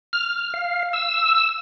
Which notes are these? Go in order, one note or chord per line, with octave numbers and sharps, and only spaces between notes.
F6
F5
E6